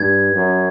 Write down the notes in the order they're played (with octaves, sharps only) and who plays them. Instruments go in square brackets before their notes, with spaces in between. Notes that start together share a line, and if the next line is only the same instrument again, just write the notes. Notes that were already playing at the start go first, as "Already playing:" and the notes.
Already playing: [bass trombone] G2 [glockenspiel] G#6
[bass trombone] F#2